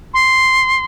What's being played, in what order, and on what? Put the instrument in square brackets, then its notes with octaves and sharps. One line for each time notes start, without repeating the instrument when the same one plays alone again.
[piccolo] C6